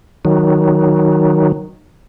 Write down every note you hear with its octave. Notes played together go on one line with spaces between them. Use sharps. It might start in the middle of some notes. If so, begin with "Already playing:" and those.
D#3 F#3